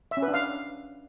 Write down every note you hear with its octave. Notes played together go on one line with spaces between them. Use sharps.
E5
C#4
B4
D4
F5